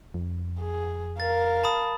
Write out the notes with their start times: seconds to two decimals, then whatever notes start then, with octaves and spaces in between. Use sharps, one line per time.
0.14 F2
0.59 G#4
1.20 A#4 F5 A6
1.63 A5 B5 D#6